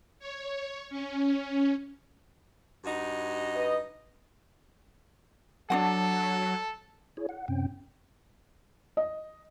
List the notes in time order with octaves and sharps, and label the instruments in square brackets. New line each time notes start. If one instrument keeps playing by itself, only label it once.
[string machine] C#5
C#4
[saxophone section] G2 D#4 F#4
[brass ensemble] B4 D#5
[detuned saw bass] F#3 [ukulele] D4 F#4 F#5 [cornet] A4
[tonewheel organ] E4 G#4 C#5
F#5
F#2 C3 C4 C#4 G5
[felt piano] D#5